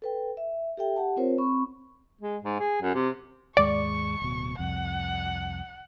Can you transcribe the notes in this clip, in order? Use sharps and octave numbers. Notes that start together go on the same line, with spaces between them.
A4 B4 G5
E5
G4 A4 E5 G5
G4 F#5 A5
C4 F4 A#4 C5 C#5
C4 B5 C#6
G#3
G#2
G#4
F#2
C3
D#2 G#2 G#3 D5 C#6
D1 B2
C2 F2 F#5